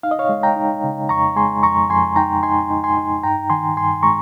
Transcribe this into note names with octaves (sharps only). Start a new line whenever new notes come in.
D#4 F5
D#5
C#5 F5
G#3
G5 A#5
D#4
C#3
F2 A#5 C#6
G#3 G#5 C6
F2 A#5 C#6
F2 G#5 C6
D#4 G5 A#5
D#4 G#5 C6
D#4
G#5 C6
D#4
G2 G5 A#5
D#3 G#5 C6
G2 G#5 C6
G#3 A#5 C#6